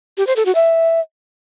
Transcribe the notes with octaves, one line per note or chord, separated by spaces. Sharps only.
G4
C5
A4
F#4
E5